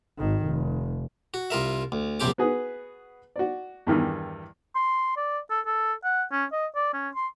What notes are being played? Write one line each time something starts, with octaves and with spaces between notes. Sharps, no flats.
G#1 D#3
F1
F#4
C2 F4 A#4 E5
D2
A#1 F#2 C3 C4 G4 D6
B3 F#4 G#4 B4
F#4 D5
E2 G2 D#3 E3
C6
D5
A4
A4
F#5
C#4
D#5
D5
C#4
C6